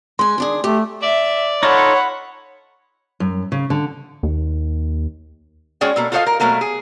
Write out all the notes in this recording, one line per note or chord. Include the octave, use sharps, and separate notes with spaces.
G#3 G#5 C6
D#3 D4 G#4
A3 G4
D5 E5
D#4 F4 A4 C#5 F#5 B5
F#2
C#3
D3
D#2
G#3 C#4 F#4 G#4 D5 G5
B2 A#3 A4
F4 F#4 A4 C5 D#5 F5
A#4
B2 F#3 A3 A#3 A#4
G#4